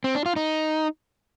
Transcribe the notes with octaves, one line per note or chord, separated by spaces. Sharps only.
C4
D4
F4
D#4